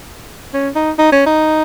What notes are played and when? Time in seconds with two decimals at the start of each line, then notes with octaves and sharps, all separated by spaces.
0.54 C#4
0.75 D#4
0.99 D#4
1.12 C#4
1.26 D#4